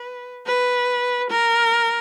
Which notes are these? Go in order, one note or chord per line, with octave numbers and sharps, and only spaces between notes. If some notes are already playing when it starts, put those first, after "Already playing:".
Already playing: B4
B4
A#4